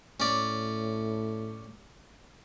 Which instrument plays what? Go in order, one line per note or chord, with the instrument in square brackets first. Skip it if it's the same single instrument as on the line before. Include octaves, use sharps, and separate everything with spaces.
[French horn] A2 [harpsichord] C#4 D5